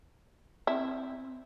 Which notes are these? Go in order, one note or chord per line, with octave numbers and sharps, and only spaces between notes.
C4 E4